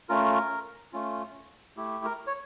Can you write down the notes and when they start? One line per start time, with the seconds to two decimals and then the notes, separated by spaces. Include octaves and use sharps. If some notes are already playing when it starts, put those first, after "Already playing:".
0.09 A3 C#4 F4 A#4
0.93 A3 C#4 F4
1.77 A3 E4 G4
2.05 A#4
2.27 C#5